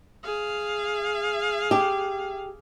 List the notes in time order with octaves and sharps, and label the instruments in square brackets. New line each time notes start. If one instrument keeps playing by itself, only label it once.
[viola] G#4 F5
[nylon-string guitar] G4